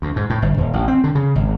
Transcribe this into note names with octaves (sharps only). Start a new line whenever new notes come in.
D2
G#2
A2
G1
D#1
A1
C4
D3
C#3
G#1